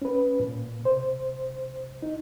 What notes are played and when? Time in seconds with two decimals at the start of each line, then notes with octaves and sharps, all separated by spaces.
0.02 C#4 B4
0.40 A#2
0.82 C3 C5
2.02 D#4